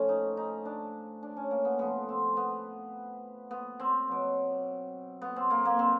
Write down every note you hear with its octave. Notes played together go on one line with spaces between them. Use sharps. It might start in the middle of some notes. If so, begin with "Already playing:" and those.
Already playing: A2 F3 C#4
D#4
D#4
D4
D4
C#4
A#3
B3
A2 F3 B3
C4
B3
B3
C4
B2 F#3
B3
C4
A#3
A#3
C4